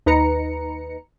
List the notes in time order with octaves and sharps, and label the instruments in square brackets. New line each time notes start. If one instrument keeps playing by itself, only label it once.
[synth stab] D#2 D#4 B4 A#5 C#7